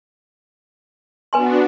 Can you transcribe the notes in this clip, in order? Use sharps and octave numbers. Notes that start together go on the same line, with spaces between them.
B3 D4 F#4 B4 G#5 C6